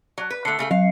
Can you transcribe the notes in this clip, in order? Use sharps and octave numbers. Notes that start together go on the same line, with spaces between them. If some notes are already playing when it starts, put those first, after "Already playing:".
F#3
B4
D3 A3 C7 C#7
C#3 A3 G#4
F#3 F5